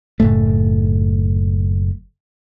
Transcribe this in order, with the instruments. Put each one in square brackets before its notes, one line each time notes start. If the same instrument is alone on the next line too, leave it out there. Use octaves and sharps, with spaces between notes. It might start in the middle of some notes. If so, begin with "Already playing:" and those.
[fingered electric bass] F#1 A2 A3